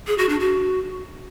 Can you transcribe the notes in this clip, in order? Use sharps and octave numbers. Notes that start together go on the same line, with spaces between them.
G#4
F#4
D4
F#4